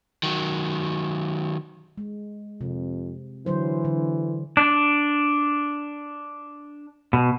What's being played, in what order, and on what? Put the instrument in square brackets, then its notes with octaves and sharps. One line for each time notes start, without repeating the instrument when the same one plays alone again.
[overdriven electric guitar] D#3 F#3
[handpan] G#3
[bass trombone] F2 [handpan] C3
[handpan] D3 F#3 C5 [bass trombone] E3
[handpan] D3
[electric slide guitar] D4
B2